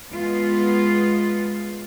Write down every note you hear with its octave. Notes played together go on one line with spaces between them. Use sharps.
G#3 B3 F4